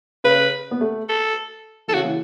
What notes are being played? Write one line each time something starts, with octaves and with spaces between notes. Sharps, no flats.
C#3 B4
B3
A3
A4
E3 A4
C#3 F#4
E3